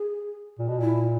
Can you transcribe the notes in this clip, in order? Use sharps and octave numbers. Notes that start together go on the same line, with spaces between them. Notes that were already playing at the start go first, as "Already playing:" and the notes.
Already playing: G#4
A#2
B2
A#2 E4